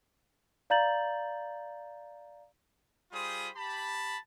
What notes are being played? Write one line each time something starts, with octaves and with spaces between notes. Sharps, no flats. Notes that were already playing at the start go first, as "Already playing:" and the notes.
D5 F5 A#5 G6 A6 F#7
G3 F4 G#4 C5 B5 D#6
G4 A5 B5